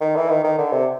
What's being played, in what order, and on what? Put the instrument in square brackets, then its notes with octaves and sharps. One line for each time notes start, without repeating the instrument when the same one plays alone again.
[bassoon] D#3
E3
D#3
D#3
D3
C3